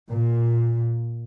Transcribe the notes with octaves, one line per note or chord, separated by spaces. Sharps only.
A#2